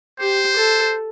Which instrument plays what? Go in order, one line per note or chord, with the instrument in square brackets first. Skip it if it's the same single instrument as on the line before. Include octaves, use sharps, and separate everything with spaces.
[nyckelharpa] G4 [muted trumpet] C5
[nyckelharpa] A4